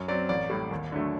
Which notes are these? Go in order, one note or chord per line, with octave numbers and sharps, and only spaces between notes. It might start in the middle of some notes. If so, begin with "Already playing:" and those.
Already playing: F#2
F#3 C4 D5
A1 D5
A2 G3
D#2
D3 F#3 A3